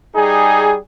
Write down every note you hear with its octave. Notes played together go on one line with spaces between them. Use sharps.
G3 D#4 G#4